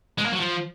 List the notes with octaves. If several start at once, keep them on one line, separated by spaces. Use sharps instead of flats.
G#3
A#3
F#3
F3